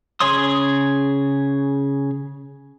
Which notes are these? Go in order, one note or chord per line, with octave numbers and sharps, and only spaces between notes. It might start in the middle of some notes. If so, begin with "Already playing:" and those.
C#3 G#4 C#5 C6 D#6